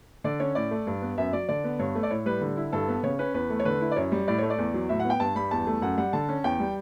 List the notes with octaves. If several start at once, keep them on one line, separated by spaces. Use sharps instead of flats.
D3 D5
C#4 C#5
A2 D5
A3
G2
B3
F#2 E5
F#3 D5
D3 D5
B3
G2 C#5
A3
D5
A2 C#5
G3 B4
D3
E4
G2 A4
B3
C#3 C#5
C#4 B4
E2 B4
A3
C#5
D3 B4
E4
D5
F#2 C#5
G3
A2 D5
A3 C#5
D5
E2
F#3
A2 E5
F#5
B3
G5
G2 A5
G3 B5
E2 A5
A3
F#2 F#5
G3 F#5
D3 A5
C#4
E2 G5
G3